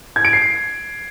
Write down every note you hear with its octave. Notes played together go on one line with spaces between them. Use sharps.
G#6
D7
C7